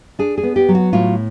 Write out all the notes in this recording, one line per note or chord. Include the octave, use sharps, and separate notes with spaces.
D4 G#4
G#4
B3
G4
F#3
F#4
A2 F4